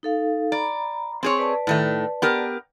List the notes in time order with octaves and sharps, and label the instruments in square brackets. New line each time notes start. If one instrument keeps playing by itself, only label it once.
[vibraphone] D#4 A4 F5
[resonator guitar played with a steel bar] D5 [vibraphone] A#5 B5
[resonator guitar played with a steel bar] C4 G#4 C#5
[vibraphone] B4 D5 A5
[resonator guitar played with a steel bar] A2 D#3 A3
B3 G4 A#4